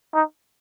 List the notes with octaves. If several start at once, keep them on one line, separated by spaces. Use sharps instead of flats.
D#4